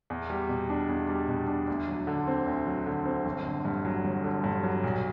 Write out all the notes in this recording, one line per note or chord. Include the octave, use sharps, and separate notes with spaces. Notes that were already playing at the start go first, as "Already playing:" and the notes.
E2
G3
B2
D4
E2
G3
B2
D4
D2
F#3
D3
C4
D2
F#3
D3
C4
G1
D3
G2
F#3
G1
D3
G2
F#3
B1